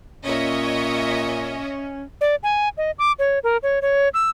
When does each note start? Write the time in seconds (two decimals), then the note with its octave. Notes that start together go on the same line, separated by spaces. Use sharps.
0.24 A#2 C#4 C#5 D#5 E5
2.21 D5
2.43 G#5
2.78 D#5
2.99 D6
3.19 C#5
3.44 A#4
3.63 C#5
3.82 C#5
4.14 E6